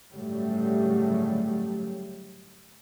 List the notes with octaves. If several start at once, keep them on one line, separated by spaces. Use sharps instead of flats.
G1 A2 C#3 F#3 G3 A3